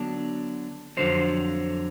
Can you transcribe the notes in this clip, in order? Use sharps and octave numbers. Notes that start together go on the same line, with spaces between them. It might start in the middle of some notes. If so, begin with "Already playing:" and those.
Already playing: D3 F#3 B3 D4
F2 D3 F#3 C5